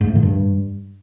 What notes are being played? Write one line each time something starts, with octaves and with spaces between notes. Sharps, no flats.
G#2
A2
D#3
G2